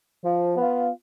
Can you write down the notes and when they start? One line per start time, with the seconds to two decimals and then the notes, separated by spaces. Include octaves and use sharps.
0.25 F3
0.56 B3
0.61 F4